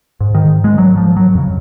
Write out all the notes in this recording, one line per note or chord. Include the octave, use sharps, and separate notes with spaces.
G#2
D#3
G#3
F#3
F3
F#3
F2 C#3